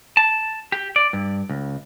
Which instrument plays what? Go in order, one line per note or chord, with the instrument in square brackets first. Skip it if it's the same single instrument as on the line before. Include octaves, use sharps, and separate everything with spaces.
[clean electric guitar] A5
G4
D5
G2
C#2